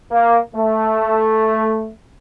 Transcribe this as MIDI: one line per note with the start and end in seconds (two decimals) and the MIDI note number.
0.11 0.38 58
0.55 1.89 57